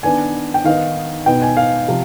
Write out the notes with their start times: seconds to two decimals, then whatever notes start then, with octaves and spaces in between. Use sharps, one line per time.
0.03 D#3 B3 D4 G#5
0.54 G5
0.64 D#3 B3 D#4 F5
1.26 B2 B3 D#4 G5
1.42 G#5
1.57 F5
1.88 C3 F3